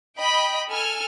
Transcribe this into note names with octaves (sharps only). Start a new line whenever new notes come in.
D#5 G5 B5
A4 G#5 F6